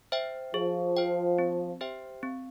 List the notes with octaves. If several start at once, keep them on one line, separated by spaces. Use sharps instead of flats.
C5 E5 G5
F3 G#4
C5 G5
C4
G4 C5 E5 G5
C4